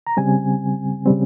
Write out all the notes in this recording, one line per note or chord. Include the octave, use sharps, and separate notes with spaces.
A#5
C#3 G3 C4 G#5
C#3 G3 C4